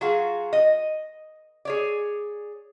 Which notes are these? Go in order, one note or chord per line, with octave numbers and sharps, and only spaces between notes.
F#3 F4 F#4 G#4
D#5
G#4 C#5 D5